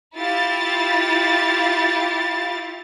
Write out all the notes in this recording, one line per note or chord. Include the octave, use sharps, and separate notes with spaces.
E4 F4 G4 A6